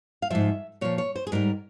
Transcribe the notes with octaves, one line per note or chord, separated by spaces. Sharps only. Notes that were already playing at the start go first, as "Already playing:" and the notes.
F5
G#2 F3 E5
A#2 F3 C#5
C#5
C5
G#4
G#2 G3 A#4